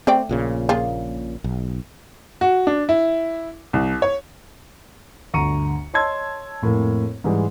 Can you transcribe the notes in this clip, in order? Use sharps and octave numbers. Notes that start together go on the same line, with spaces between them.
A3 C4 D5 G5
A#1 A#2 C#3
A#3 F4 G#4
B1
F#4
D4
E4
C2
C#5
G1 D2 A#5 C#6 C#7 D#7
C#5 D#5 A5 C6 E6 G#6
F2 A2 A#3
G#2 E3 G3 G#3